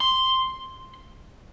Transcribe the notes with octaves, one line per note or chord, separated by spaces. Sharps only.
C6